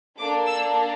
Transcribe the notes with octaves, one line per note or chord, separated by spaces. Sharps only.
A#3 D4 A4 D6
E6